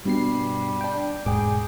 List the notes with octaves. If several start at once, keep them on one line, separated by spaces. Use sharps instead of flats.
G2 B2 G3 C7
D4 G5
E1 G#2 G#4 G5 D6